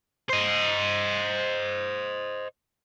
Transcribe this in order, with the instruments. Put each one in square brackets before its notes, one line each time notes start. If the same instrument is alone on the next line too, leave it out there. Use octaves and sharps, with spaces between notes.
[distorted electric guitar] C5 D#5